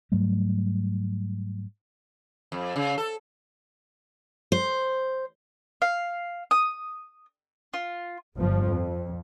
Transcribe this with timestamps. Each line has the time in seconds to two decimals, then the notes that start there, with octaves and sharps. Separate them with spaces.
0.12 G#2 F#3 G3 A3
2.52 F2
2.76 C#3
2.98 A4
4.52 C5
5.82 F5
6.51 D#6
7.74 F4
8.38 G1 F3
8.68 F2